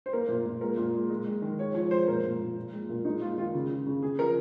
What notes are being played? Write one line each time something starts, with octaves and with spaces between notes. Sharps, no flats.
C5
A#3 A#4
A#2
A#2
G#3 A#4
A#2
G#3
G#3
G#3
D#3
G#3 C#5
F3 C#5
G#3 C5
A#2 A#4
A#2
A#2
A#2
G#3
A#2
G#3 D#4
G#3 F4
D#3 F4
C#3
C#3
C#3
C#3 G#4
F3 A#4